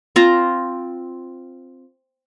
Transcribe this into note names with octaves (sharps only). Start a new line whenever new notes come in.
C4 F4 A#5